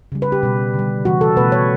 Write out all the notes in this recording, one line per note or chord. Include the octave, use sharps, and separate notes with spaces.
C#3 G3
B4
G4
B2 G3
D3 G3
C#3 E3 G3 F#4
A4
B2 A3 B4
C#5